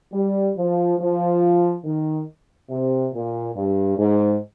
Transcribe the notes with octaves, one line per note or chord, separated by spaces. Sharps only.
G3
F3
F3
D#3
C3
A#2
G2
G#2